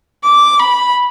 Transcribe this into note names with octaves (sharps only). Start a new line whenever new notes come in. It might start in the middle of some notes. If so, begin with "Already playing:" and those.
D6
B5